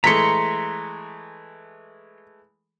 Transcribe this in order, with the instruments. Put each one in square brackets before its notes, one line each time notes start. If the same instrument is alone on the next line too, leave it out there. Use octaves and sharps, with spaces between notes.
[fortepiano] E3 G#3 A3 [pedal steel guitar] A#5 C6 [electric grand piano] B6 C#7